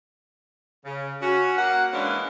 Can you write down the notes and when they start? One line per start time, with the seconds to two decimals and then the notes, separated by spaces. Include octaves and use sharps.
0.84 C#3
1.21 C#4 F#4
1.56 A#3 F#5
1.92 E3 G#3 A#3 C#4 D4